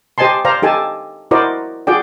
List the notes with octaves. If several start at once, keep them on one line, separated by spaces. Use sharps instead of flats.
G4 C5 D#5 G#5 A5 C6
C5 D5 F5 A#5
D#4 G4 A4 G#5 A5
E4 F#4 A#4 C5 D5 D#5
F4 F#4 G#4 D5 G5